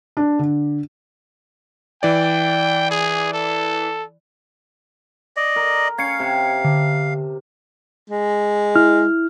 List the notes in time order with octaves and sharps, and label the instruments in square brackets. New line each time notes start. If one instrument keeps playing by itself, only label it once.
[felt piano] D4
D3
[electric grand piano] E3 D5 [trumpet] G5
[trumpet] G#4
A4
[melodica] D5 D#5
[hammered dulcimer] A#4
[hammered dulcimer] C#4 [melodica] F5 [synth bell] G#6 C#7
[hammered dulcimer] C3
[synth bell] D3
[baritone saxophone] G#3
[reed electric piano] E4 F6